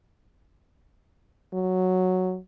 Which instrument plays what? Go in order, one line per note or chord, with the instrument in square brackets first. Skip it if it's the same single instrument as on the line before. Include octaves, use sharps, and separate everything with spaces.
[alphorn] F#3